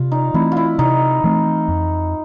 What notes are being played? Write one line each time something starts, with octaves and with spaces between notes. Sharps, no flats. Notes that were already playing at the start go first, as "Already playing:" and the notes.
Already playing: C3 F4
D#4
E3 A3 C4 E4
E4 F4
C3 D#4
E3 A3 C4
F2